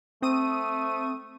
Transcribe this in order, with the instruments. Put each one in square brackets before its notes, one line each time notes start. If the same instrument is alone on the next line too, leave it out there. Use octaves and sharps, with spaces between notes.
[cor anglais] A3 [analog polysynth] C4 D#6 D#7